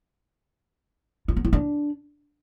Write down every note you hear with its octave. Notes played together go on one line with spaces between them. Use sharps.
F4
B3
E4
D4